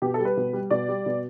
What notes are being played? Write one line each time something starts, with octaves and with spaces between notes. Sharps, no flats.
B2 G4
A4
G3
B4
B2
G3
B2 D5
G3
B2